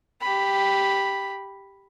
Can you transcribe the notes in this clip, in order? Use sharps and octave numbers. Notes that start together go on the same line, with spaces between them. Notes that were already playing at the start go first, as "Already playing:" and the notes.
G4 B5